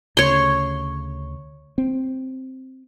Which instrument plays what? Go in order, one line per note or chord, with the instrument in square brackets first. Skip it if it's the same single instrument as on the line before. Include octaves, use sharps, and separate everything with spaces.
[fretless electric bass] D2 C#3 [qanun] C#5 C6
[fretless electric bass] C4